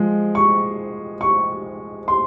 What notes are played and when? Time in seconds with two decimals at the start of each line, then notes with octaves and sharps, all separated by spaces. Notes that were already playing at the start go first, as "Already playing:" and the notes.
Already playing: F3 G#3
0.35 C#6
1.21 C#6
2.08 C6